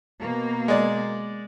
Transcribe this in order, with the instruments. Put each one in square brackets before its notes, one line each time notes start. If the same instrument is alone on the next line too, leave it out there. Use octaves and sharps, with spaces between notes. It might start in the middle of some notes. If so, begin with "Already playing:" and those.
[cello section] B2 A#3
[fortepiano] G#3 D5